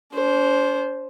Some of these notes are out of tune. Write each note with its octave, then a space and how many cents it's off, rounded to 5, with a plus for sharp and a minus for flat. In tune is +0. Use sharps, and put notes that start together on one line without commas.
D4 -45 C5 +0